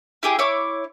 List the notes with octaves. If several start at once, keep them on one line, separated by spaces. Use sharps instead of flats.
E4 G4 G#4
E4 C#5 D6